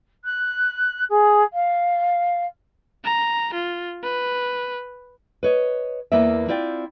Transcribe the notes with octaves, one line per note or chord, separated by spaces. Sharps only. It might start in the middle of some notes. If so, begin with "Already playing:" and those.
F#6
G#4
F5
A#5
F4
B4
B4 C#5 D#5
E2 E3 A#3 B3 D5 E5
C4 E4 F4 D5 G5